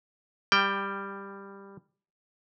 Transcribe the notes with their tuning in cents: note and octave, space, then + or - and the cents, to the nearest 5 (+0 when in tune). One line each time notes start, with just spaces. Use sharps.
G3 +10 G5 +0